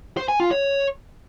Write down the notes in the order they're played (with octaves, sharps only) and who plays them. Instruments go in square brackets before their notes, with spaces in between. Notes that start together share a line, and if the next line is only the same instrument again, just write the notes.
[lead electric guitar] C5
G#5
F4
C#5